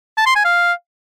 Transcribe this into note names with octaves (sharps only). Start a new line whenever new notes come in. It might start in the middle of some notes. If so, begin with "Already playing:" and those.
A5
C6
G#5
F5